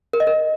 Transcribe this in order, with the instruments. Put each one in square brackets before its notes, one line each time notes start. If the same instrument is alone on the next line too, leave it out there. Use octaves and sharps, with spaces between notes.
[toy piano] A#4
D#5
A#4